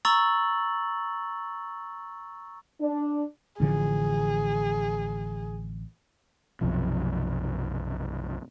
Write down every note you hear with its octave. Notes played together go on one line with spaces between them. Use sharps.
A#5 C#6 E6 A6 F#7
D4
A1 D3 F3 G#4
B1 F#2 C3 F3